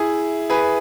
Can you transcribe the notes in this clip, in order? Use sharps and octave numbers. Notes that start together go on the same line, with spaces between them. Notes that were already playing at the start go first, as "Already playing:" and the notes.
Already playing: E4 G#4
G#4 B4